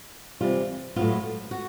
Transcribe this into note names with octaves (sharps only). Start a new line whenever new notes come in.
C3 E3 G3 F4
A2 F#3 B3 F4
F#4